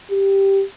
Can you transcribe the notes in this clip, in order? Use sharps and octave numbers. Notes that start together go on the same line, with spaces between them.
G4